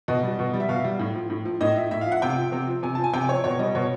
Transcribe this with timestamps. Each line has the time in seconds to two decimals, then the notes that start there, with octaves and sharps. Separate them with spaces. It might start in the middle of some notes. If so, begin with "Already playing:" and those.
0.08 B2 D#5
0.23 G3
0.39 B2
0.54 G3
0.60 E5
0.69 B2 F5
0.84 G3
0.99 A2
1.15 F3
1.30 A2
1.45 F3
1.61 A2 D#5
1.76 F3 E5
1.91 A2 E5
2.01 F5
2.06 F3
2.12 F#5
2.22 C3 G5
2.38 F3
2.52 C3
2.67 F3
2.83 C3 G#5
2.95 F3 A5
3.04 G#5
3.13 C3 G5
3.29 F3 C#5
3.44 B2 C#5
3.59 G3 D#5
3.75 B2 C#5